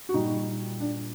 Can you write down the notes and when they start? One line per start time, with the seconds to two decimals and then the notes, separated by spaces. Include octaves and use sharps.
0.09 F#4
0.14 A#2 G3 D#4
0.80 D4